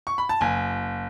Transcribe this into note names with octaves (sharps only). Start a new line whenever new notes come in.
C#6
B5
A5
F#1 G#5